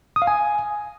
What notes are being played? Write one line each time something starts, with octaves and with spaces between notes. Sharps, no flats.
D#6
F5
G#5